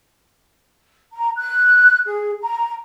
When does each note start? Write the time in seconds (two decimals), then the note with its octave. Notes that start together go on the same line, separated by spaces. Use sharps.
1.13 A#5
1.37 F#6
2.06 G#4
2.41 A#5